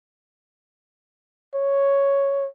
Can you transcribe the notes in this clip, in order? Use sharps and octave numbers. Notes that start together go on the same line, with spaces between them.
C#5